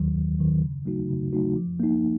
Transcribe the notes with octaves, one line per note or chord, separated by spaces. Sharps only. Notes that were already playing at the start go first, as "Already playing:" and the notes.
Already playing: D#2 D#3 F#3
D#2
D#3 F#3
C#3
F#3 A3 D#4 F#4
C#3
F#3 A3 D#4 F#4
F3
A#3 D#4